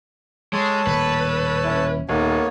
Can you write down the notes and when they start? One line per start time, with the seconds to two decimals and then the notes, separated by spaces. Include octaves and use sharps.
0.53 G#3 A4 C#5 A5
0.87 D#1 A2 B4
1.64 C#4 E4
2.09 D#1 A#3 B3 C#5